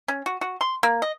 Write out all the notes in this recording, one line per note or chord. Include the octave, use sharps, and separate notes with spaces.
C#4
F#4
F#4
C6
A#3
D#5